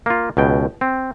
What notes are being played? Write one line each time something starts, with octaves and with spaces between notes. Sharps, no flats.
A#3 F4
C#2 B2 G5
C4